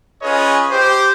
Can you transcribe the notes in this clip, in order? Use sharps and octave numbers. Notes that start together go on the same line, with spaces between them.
C#4 F4 G#4 B4 C#5 D#5
G4 C5